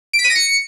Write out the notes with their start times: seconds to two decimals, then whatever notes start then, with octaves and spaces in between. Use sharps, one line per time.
0.13 D7
0.19 B6
0.24 D#7
0.30 A#6
0.35 C#7